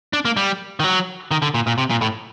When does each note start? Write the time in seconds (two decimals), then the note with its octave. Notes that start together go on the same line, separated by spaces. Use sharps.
0.13 D4
0.25 A#3
0.37 G3
0.80 D#3
0.84 F#3
1.31 D#3
1.42 D3
1.55 A#2
1.67 A#2
1.78 C3
1.90 A#2
2.01 A2